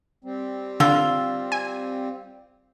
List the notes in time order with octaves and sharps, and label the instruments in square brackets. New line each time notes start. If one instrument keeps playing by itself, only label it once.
[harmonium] G3 C4
[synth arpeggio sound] D3 [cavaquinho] F4 [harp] E6
[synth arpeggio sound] G#5